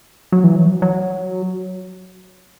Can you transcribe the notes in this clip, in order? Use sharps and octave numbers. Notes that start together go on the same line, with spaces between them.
F#3
E3
F#3
F#3